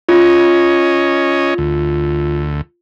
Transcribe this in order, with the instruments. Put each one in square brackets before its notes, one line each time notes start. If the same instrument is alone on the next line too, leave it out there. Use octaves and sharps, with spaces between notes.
[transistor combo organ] C#4 C#5 D#5 [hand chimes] F4
[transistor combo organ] D2